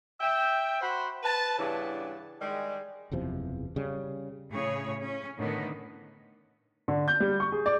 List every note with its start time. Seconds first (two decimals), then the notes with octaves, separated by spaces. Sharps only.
0.21 E5 G5
0.81 F#4 C5 F#5 B5 C6
1.23 B4 A5
1.59 G2 C#3 E3 B3 D4
2.41 D#3 G3 G#3
3.12 F#1 E2 C3 F3
3.76 C#3 G3
4.51 A2 C#3 G#4 C#5
5.01 C#4
5.38 A2 D3 D#3 B3
6.88 D3
7.08 G6
7.20 G3
7.40 C#6
7.52 G#4
7.66 D5